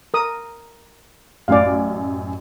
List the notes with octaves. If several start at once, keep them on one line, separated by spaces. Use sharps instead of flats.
A#4 D#6
A1 F#2 D5 F5 G#5